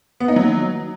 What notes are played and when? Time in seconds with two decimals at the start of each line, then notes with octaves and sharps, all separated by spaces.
0.20 B3
0.28 D#4
0.36 F#3